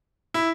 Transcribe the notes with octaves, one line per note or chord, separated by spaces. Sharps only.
E4